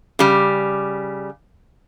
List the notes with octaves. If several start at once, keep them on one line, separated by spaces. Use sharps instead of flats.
C#3 G3